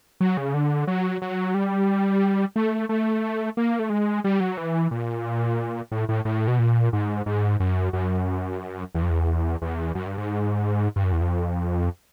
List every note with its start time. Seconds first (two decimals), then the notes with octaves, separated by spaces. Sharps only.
0.21 F#3
0.37 C#3
0.54 D3
0.87 F#3
1.22 F#3
1.54 G3
2.56 A3
2.89 A3
3.57 A#3
3.79 A3
3.90 G#3
4.24 G3
4.40 F#3
4.57 E3
4.91 A#2
5.92 A2
6.09 A2
6.25 A2
6.48 B2
6.59 A#2
6.93 G#2
7.26 G#2
7.60 F#2
7.93 F#2
8.95 E2
9.02 F2
9.10 E2
9.62 E2
9.95 F#2
10.06 G2
10.18 G#2
10.96 G2
11.04 F#2
11.12 E2
11.21 F2